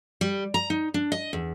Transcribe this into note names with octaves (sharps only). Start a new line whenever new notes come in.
G3
A#5
D#4
D4
D#5
E2